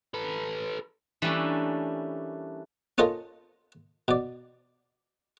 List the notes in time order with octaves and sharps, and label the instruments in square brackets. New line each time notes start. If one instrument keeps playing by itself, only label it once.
[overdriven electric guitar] A4 B4
[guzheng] E3 G3 A3 A#3 C#4 D4
[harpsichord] C#4 D#4 F4 A4 A#4
B2 D5